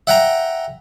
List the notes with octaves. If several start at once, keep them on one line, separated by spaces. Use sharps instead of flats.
E5 F#5 G5 A#5